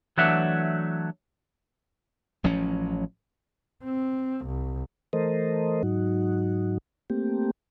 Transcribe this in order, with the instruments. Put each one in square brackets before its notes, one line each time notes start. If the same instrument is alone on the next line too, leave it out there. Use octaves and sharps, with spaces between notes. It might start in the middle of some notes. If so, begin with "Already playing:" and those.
[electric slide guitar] E3 F#3 A3 D4 E5 F#5
[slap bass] A1 F3 F#3 C#4
[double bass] C4
C2
[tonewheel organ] E3 A3 A4 A#4 C5 D#5
G#2 F#3 D#4 F#4
A3 A#3 C4 G4